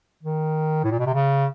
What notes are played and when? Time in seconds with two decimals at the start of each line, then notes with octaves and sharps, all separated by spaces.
0.23 D#3
0.84 A2
0.92 A#2
0.99 B2
1.06 C3
1.14 C#3